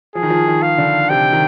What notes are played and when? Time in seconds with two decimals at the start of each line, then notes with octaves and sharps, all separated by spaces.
0.15 F3 G#4
0.23 D#3
0.30 F3
0.47 D#3
0.62 F5
0.78 D3
1.10 C3 G5
1.33 D#3